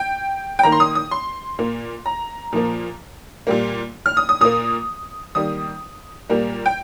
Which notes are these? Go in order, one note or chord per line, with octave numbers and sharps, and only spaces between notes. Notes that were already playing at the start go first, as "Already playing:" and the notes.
Already playing: G5
G5
D#3 A#3 A#5
C6
D#6
D#6
C6
A#2 A#3
A#5
A#2 F3 A#3
A#2 G3 A#3
F6
D#6
D#6
A#2 A#3 D#6
D#3 G3 A#3 D#6
A#2 G3 A#3
G5